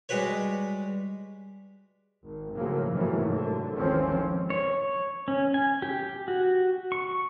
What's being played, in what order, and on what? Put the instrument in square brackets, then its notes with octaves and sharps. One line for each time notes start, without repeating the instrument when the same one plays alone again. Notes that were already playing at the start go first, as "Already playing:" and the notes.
[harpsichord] G3 G#3 F#4 B4 C#5
[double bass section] G#1
A2 C#3 F3 F#3 A#3
G#2 C3 E3 F#3 A3 A#3
D3
G#1 D#2 E3 F3 C4 C#4
[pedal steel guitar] C#5
C#4
G#5
G4
F#4
C#6